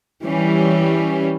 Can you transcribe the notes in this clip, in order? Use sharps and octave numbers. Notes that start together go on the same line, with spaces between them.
E3 G3 C#4